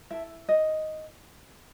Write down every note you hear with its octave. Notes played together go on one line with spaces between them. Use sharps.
E4 A4 E5
D#5